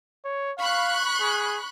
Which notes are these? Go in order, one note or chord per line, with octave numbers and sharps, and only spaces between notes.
C#5
F5 B5 C#6 F#6
G#4